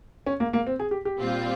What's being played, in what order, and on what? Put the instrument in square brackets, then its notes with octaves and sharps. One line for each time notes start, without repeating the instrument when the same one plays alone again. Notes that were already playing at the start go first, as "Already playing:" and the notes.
[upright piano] C#4
A#3
A#3
C4
G#4
G4
G4
[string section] A#2 G3 C4 F4